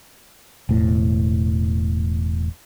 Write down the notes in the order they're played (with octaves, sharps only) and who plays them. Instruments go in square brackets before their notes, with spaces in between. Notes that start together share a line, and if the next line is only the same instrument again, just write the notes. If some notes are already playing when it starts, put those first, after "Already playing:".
[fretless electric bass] E1 A2